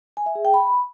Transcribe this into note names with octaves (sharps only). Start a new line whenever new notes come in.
G#5
E5
G#4
G5
B5